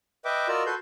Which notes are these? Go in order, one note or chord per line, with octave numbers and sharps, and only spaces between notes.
B4 D#5 E5 G5 D6
F4 F#4 A#4 D5 D#5 E6
F#4 A4 B4 C6 G6